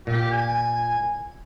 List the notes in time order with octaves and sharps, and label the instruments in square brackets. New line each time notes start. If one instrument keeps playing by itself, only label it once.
[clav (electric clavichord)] A#2 [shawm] G4
[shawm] G#5